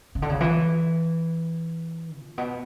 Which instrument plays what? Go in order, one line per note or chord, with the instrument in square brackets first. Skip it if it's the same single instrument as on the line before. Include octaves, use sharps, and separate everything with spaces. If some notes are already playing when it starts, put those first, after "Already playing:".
[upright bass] C#3
D3
C#3
E3
A#2
B2